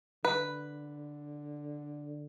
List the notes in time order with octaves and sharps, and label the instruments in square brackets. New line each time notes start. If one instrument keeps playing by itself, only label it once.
[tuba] D3 [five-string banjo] B4